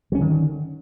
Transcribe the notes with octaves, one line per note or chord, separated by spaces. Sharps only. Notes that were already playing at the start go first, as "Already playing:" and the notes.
D3 D#3 F#3 C#4